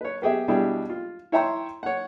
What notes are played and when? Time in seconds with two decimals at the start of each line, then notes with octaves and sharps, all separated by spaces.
0.01 B4 C#5
0.22 B3 G4 G#4 E5
0.48 B2 G3 D4 E4 G4 G#4
0.89 F4
1.32 E4 C#5 E5 G5 A#5 C6
1.83 C#5 F#5